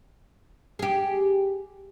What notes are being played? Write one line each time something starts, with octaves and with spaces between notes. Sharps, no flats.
G4 G#4